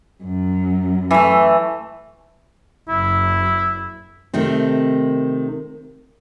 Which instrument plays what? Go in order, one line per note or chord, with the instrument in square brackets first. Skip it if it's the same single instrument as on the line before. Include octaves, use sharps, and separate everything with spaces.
[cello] F#2
[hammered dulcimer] E3 A3
[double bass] F#1 [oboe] E4
[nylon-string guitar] C3 D#3 A3 C4